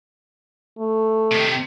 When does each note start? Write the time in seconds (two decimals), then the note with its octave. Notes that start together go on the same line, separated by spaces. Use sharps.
0.78 A3
1.32 C3 D#3